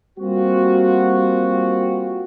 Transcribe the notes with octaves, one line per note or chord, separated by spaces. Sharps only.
G3 A#3 C4 F4 F#4